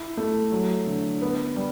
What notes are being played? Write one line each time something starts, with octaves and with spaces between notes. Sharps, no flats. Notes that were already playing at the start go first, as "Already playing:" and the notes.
Already playing: E4
A3
F#3
D3
B3
G3